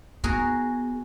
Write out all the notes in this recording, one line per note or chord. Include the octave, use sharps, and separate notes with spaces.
B3 F#4 G#4 A#4